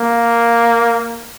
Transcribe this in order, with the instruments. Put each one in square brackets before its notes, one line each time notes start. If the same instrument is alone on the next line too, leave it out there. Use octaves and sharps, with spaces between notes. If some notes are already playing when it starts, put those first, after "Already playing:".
Already playing: [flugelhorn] A#3